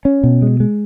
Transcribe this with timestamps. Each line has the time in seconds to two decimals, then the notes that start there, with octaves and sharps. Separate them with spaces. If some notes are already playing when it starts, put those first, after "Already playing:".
0.05 C#4
0.24 B2
0.42 G#3
0.60 G#3